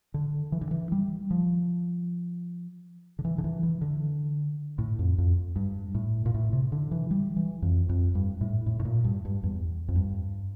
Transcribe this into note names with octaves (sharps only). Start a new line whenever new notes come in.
D3
E3
D3
E3
G3
F3
D3
E3
D3
E3
E3
D3
A2
F2
F2
G2
A2
A#2
A2
C3
D3
E3
G3
E3
F2
F2
G2
A2
A2
A2
A#2
G2
G2
E2
F2
G2